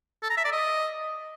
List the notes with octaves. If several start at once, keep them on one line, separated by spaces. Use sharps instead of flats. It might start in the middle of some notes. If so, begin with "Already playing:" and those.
A4
A#5
E5
D5
D#5